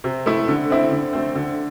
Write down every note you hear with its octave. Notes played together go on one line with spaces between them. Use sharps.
C3
A3 E4
D3
C4 E4
D3
A3 C4
D3